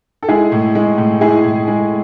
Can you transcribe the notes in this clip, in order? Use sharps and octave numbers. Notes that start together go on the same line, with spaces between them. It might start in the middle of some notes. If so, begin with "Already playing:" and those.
A4
G#3 E4 G#4
A2
G#3
A2
G#3 E4 G#4
A2
G#3